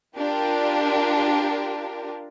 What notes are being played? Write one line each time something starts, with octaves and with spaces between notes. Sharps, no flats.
D4 F4 G4 A#4